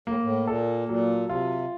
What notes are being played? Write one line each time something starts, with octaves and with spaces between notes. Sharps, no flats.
A2 A#3
A2
A#2 A4
A#2 F#3
C3 F4